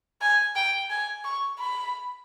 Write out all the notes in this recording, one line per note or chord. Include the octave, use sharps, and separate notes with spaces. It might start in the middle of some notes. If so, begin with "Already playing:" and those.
G#5
G5
G#5
C#6
B5